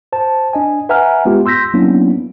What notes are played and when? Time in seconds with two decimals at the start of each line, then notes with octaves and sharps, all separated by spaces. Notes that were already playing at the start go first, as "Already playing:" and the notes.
0.13 C5 A5
0.53 D4 D#5 G#5
0.89 B4 E5 F#5 G#5 A#5 F6
1.25 G#3 B3 F4 G4
1.46 C6 E6 G6 A#6 B6
1.74 F#3 A#3 B3 C#4 D4 E4